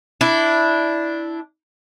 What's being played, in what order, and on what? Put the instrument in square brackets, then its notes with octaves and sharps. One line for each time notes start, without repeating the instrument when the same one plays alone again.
[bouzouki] D4 E4